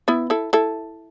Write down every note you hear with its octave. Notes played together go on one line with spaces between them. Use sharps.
B3 E4
E4 A4
E4 A4